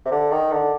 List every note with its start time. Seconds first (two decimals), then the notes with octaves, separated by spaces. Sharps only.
0.05 C3
0.12 D3
0.31 D#3
0.51 D3